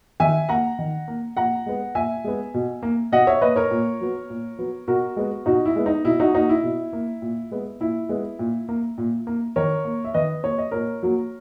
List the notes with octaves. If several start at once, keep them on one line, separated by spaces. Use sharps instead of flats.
D#3 E5 G#5
A#3 F#5 A#5
D#3
A#3
A#2 F#5 A#5
G#3 B3
A#2 E5 G#5
G#3 B3
B2
A#3
B2 D#5 F#5
C#5 E5
A#3 B4 D#5
A#4 C#5
A#2
F#3 B3
A#2
F#3 B3
B2 F#4 A#4
G#3 B3
B2 D#4 F#4
E4
G#3 B3
D#4
B2 E4
D#4 F#4
A#3 D#4 F#4
E4
B2
A#3
A#2
G#3 B3
A#2 E4
G#3 B3
A#2
A#3
A#2
A#3
D#3 A#4 C#5
A#3
E5
D#3 B4 D#5
A#3 C#5
D#5
A#2 A#4 C#5
F#3 A#3